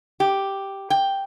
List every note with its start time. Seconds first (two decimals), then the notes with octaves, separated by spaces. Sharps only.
0.20 G4
0.90 G5